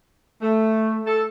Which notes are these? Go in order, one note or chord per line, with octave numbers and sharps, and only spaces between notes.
A3
A4